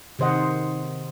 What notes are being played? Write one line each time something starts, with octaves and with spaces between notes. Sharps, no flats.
C3 D#3 C5 D#5 F#5